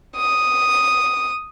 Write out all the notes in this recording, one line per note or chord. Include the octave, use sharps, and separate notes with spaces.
D#6